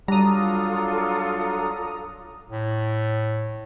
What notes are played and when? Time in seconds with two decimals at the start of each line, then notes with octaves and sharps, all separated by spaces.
0.08 F#3 G3 D4 F4 A4 A#5 D#6
2.50 A2